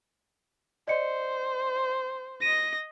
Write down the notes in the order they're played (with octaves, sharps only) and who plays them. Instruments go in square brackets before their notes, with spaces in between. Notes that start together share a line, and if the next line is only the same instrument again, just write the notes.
[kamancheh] C5 [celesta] D5 D#5 C#7
[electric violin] D#5 A#6 [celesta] D#7